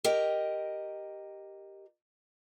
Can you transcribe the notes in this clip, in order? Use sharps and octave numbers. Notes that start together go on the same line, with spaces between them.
G4 A#4 D#5 G5